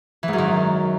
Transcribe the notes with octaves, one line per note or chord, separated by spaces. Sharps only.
E3
G#2
F#2
D#3